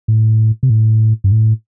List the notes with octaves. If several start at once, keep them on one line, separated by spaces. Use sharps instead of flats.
A2
C3
A2
G2
A2